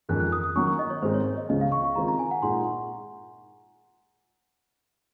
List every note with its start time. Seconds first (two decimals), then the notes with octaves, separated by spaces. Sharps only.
0.09 F2 D#3 G#3 C#4 F#6
0.20 F#6
0.32 D#6
0.44 D#6
0.56 D#3 F#3 C#4 C#6
0.67 C#6
0.79 D#5
0.90 C#5
1.02 G#2 D#3 G#3 C4 C5
1.14 C#5
1.26 C#5
1.37 D#5
1.49 C#2 C#3 G#3 C#4 D#5
1.61 F5
1.72 C#6
1.85 C#6
1.95 D#3 G#3 C4 F4 A#5
2.08 A#5
2.19 G#5
2.31 F#5
2.42 A#2 G#3 D#4 G#4 C6